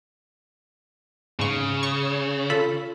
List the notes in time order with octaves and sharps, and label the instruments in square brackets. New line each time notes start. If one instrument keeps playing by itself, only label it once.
[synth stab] G#2 C#6 [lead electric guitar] C#3
[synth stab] C#6
F4 A4 B5